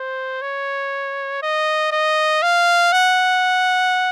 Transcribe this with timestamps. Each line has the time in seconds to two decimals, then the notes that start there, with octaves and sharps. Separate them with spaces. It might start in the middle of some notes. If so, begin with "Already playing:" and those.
Already playing: C5
0.42 C#5
1.43 D#5
1.92 D#5
2.42 F5
2.92 F#5